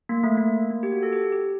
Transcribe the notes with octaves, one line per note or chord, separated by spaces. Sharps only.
A#3
A3
A#3
A#3
G4
F#4
A4
G4
G4